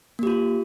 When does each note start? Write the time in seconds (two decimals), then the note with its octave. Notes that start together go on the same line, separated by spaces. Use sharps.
0.19 A#3
0.23 G4
0.27 F4